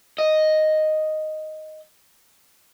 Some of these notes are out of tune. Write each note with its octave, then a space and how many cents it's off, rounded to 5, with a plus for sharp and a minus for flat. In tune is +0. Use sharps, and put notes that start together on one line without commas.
D#5 +0